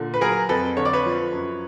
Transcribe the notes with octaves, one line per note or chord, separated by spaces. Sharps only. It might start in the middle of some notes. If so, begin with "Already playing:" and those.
Already playing: A#2 D3
B4
F#3 G#4 A#4
F2 A4 B4
D3 C#5
D5
B4 C#5
F3
F#2